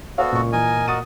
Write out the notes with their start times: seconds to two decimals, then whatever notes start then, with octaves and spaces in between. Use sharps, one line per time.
0.18 B3 F#4 A4 C5 D5 F5
0.33 C#2 A#2 C#6
0.52 E3 A#4 D#5 G#5
0.88 F#4 D#6 A6 D#7